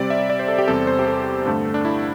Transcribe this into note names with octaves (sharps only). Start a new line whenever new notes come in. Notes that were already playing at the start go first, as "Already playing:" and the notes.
Already playing: C3 G3 C4 D5
E5
D5
C5
A4
G4
E2 C3 G3 C4 A4
C5
G4
A4
G2 D3 A3
D4
E4